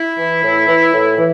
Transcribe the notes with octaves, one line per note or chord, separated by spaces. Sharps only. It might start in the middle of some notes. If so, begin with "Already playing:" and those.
Already playing: E4
E3
A2
E3
A2
E3